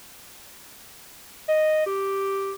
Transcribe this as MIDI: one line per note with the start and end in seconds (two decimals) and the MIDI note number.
1.48 1.85 75
1.86 2.53 67